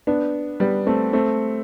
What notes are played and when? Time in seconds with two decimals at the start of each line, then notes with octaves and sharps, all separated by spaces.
0.07 B3 D4
0.60 G3 B3
0.86 A3 C4
1.13 A3 C4